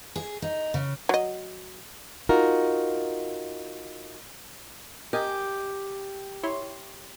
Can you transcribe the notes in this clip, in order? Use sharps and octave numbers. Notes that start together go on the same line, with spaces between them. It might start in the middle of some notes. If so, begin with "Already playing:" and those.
G#4
D#4
C#3
F#3 D#5
D#4 F4 F#4 A#4
G4 A#4 D#5 G#5
E4 C#5 C6